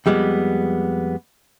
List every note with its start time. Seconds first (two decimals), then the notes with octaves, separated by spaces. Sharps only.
0.06 F2 G3 G#3 B3